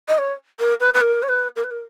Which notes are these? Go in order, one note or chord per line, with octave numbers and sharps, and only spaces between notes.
D#5
C#5
A#4
B4
B4
A#4
C#5
B4
A#4
B4
A#4